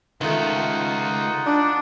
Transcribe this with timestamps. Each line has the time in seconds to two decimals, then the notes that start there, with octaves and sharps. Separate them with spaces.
0.21 C#2 D#3 A3 D#4 F4 F#5
1.45 D4